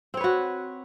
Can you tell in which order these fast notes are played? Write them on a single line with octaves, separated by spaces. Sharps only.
C4 C#5 B4 F#4